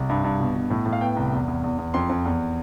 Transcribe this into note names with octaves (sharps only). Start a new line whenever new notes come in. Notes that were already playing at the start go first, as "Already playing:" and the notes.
Already playing: C2
G2
G2
B2
B2
A2
A2
F5
B3 G5
C2
E2
E2
E2
E2
F2 C6
F2
E2